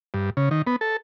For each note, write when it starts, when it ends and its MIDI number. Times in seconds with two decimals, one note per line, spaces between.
0.14 0.30 43
0.37 0.49 49
0.51 0.62 51
0.67 0.76 59
0.81 0.97 69